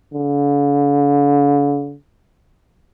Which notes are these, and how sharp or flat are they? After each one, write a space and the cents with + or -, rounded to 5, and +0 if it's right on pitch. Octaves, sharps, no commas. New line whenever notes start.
D3 -45